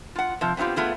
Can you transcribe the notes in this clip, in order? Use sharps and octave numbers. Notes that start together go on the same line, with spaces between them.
F4 F#5
C3 F3
B3 C4 D#4 F4 G4
A3 B3 F4 G#4